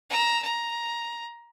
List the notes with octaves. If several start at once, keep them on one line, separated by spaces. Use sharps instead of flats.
A#5 E6
A#5